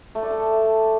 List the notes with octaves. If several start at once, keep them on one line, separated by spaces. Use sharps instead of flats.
A3
D5
A4